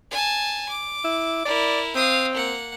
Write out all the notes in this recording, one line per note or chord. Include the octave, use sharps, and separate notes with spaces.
G#5 A5
D6
E4
E4 A#4 D5
C4 F5 D#6
A#3 F#5